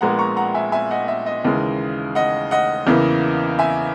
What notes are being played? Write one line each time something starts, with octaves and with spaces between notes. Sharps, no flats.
A#1 A#2 G#3 B3 F#5 A#5
A#5 C#6
F#5 A#5
E5 G#5
E5 G#5
D#5 F#5
E5
D#5
D#2 C#3 E3 G#3
D#5 F#5
D#5 F#5
E2 C#3 E3 A#3
E5 G#5